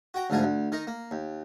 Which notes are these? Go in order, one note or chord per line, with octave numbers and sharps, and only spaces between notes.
F#4 G5 A#5
D2 G#2 D3 F3 A#4 G#5
D2
D#3 D#4 A#4
A#3
D#2